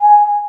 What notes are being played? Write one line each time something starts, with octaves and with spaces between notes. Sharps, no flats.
G#5